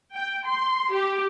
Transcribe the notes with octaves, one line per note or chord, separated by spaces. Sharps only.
G5
C6
G4